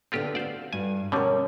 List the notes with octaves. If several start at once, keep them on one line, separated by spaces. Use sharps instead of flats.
D3 B3 C4 F4 G4 A4
F#4 C5 D5 F5
G2 G#5
B2 D3 G3 C#4 A#4